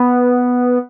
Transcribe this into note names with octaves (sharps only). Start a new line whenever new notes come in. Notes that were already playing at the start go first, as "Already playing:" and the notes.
Already playing: B3